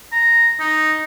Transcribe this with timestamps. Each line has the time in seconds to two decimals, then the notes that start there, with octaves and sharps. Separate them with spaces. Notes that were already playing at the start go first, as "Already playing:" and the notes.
0.12 A#5
0.59 D#4